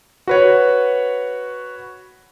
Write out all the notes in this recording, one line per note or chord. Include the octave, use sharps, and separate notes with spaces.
F#4 B4 C#5